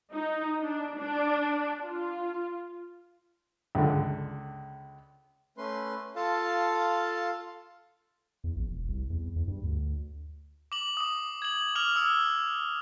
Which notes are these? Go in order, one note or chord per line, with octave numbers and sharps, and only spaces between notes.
D#4
D4
D4
F4
C#2 D3
A3 C#4 B4 C6
F4 A4 F5 A5
E2
A#1
E1
C2
E2
E2
G2
D2
D6 F#7
D6 D#6
G#6 F#7
D6 F6 F7 G7
D#6 E6